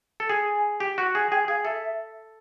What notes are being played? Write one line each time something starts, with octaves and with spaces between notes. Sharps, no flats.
A4
G#4 G#5
G4
F#4
G#4
G#4 G5
G#4 F5
A4 E5